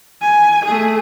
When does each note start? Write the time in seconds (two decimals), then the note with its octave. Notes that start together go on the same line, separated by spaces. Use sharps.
0.22 G#5
0.65 A3 G#4